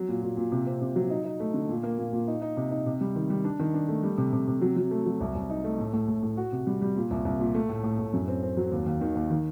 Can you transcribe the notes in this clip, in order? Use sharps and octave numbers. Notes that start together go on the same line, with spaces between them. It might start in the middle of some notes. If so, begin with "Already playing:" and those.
Already playing: F#3
A#2
A#2
A#2
C3
C4
C3
F#3
D#4
D#4
A3
D3
A#2
A#3
A#2
A#2
D#4
D#4
C3
D#4
C3
G3
D#3
G3
D4
D#3
D4
A3
G3
C3
C3
C3
F#3
F#3
A3
F#3
C2
C2
D#4
A3
A2
A2
A2
A2
F#4
C3
G3
G3
A#2
C2
C2
A#2
A3
A2
A2
A2
F#2
C4
C4
F#3
D#2
D#2
D#3
D#2
D#3